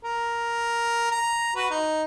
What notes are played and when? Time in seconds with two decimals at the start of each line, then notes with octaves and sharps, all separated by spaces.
0.05 A#4
1.11 A#5
1.56 F#4 B4
1.70 D#4